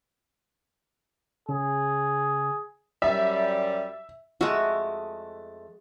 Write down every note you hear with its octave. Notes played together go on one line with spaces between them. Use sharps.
C#3 G#4
F#2 G3 E5
F2 G#3 A3 F#4 E5